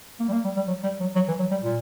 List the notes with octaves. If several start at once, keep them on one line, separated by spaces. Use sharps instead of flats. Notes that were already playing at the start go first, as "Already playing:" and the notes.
A#3
G3
A#3
G3
G3
F#3
G3
F#3
F#3
E3
F#3
G3
A#2